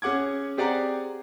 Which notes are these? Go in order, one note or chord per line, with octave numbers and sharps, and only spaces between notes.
C#4 G#4 F#5 D6 G#6
C4 G4 G#4 D5 F#5 A#5